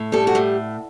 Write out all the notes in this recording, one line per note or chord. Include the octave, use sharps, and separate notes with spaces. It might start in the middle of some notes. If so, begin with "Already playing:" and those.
Already playing: A2
G3 A4
F#4
A2